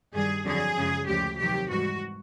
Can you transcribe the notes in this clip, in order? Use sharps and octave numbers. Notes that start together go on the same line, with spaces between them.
G2 D#3 G3 G#4
F2 D3 F#3 G#4
F#2 C#3 F3 G#3
D2 C#3 F3 G#3 G4
F2 C3 D#3 F#3 G4
G#2 E3 G3 F#4